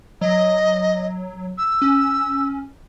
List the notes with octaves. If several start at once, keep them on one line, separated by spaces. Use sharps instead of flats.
F#3 D#5
E6
C#4